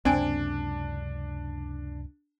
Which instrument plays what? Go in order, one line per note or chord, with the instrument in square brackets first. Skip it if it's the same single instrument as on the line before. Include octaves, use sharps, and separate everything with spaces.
[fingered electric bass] C#2 F#2 C3 [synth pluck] C4 G#5 D7 [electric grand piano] D4